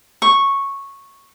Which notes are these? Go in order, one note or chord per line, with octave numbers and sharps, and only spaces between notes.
C#6